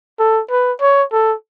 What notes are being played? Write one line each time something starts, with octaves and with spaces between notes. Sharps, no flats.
A4
B4
C#5
A4